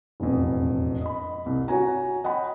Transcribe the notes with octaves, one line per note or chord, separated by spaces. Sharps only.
E1 A1 F2
D#5 B5
C2
F#4 C#5 G#5 A#5
D#5 F#5 G5 B5